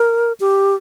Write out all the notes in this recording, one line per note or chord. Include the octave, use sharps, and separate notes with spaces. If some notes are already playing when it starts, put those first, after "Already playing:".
Already playing: A#4
G4